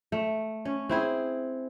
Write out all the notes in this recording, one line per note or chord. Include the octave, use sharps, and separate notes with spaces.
A3
C#4
C4 E4 G#4